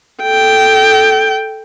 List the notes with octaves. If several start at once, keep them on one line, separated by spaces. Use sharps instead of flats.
A4 G5